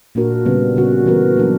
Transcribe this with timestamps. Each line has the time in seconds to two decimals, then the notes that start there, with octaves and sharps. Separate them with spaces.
0.15 A#2 A#3 D4 F#4 A#4
0.46 C#3 G3 B3
0.76 C#3 G3 C#4 F#4
1.06 E3 B3 F#4 A#4
1.37 F#3 A#3 D4 A#4